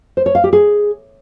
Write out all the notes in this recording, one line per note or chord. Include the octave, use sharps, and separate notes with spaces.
C5
C#5
F5
G4
G#4